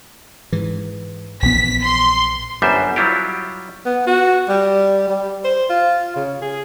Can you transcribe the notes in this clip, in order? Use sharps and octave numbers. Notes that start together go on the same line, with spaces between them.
G#2 E3
A#1 E3 B3 B6
C6
G1 F#2 G3 B3 C5 E5
F#3 G3 E4 F4 G4
B3
F#4
G3
G3
C5
F4
C#3
G#4